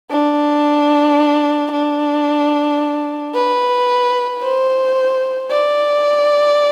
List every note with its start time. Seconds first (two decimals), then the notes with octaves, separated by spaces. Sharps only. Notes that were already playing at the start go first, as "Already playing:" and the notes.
0.11 D4
1.72 D4
3.35 B4
4.42 C5
5.51 D5